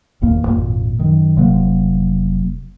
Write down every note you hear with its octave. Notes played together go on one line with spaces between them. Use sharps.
E1 A1 D#2 A#3
G#1 F2 A#2
F#2 D#3
F1 C3 F#3 A#3